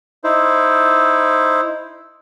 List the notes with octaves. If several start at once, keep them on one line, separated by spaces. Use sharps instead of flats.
D#4 E4 C5